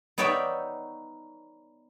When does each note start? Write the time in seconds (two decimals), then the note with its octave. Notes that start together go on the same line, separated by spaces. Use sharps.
0.18 B3 D#4 C#5 D5 E5 G5